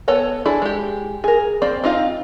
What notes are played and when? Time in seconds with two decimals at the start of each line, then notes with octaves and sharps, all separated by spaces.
0.08 B3 A4 C#5 F#5
0.45 D4 E4 G#4 A4
0.62 G#3 G4
1.24 G#4 A#4
1.62 A#3 C4 C5 D5
1.84 C4 D#4 F4 F5